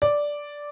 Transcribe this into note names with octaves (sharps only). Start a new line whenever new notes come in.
D5